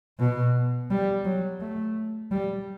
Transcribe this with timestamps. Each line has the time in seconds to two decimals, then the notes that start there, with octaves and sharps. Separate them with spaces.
0.19 B2
0.91 G3
1.25 F#3
1.60 A3
2.31 G3